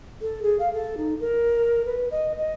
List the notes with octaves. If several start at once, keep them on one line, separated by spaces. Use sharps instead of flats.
A4
G#4
F5
A4
D#4
A#4
B4
D#5
D#5